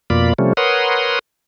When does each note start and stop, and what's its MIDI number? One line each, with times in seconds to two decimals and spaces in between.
0.10 0.33 41
0.10 0.33 47
0.10 0.33 58
0.10 0.33 65
0.10 0.33 74
0.10 0.33 83
0.39 0.53 48
0.39 0.53 53
0.39 0.53 55
0.39 0.53 57
0.39 0.53 61
0.57 1.19 70
0.57 1.19 71
0.57 1.19 73
0.57 1.19 78
0.57 1.19 84
0.57 1.19 87